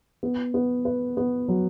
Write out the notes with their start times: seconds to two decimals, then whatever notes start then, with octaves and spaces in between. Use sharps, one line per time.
0.23 B3
0.54 B3
0.85 B4
1.17 B3
1.48 F#3